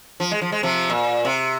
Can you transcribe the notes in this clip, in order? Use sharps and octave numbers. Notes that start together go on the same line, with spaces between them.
F3
G#3
F3
G#3
C3 F3
A#2
C3